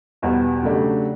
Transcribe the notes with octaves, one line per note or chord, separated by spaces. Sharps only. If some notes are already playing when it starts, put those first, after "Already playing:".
E2 B2 G3 B3
C#3 F#3 A3 D4 G4